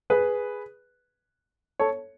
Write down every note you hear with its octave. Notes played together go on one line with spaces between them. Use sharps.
G#4 B4
A4 C#5